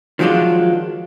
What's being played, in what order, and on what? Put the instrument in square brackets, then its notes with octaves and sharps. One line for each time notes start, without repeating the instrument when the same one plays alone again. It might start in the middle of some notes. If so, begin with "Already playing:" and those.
[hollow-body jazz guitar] D#3 F3 F#3 G#3 D4 F4